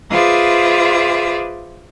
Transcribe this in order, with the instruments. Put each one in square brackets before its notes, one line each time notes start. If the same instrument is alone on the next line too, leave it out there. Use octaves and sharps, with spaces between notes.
[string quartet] F4 G#4 B4 C5 D5 E5